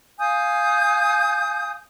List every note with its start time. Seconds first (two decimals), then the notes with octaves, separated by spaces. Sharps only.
0.19 F5 G#5 D#6 G6